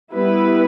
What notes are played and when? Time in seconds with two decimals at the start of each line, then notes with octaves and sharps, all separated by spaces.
0.14 G3 B3 E4 B4